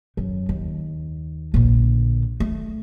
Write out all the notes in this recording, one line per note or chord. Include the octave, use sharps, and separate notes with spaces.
F#2
D#2
A#1 D3
A3